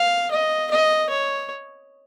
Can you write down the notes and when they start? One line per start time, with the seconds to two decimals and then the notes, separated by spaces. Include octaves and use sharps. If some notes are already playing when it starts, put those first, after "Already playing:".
Already playing: F5
0.31 D#5
0.71 D#5
1.09 C#5